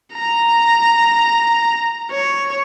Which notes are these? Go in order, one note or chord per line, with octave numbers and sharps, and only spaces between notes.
A#5
C#5